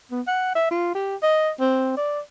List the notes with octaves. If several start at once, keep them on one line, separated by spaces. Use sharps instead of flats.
B3
F#5
E5
F4
G4
D#5
C4
D5